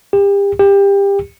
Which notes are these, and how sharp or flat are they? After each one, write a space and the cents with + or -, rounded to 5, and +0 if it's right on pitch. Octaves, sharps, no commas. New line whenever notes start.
G4 +35
G4 +25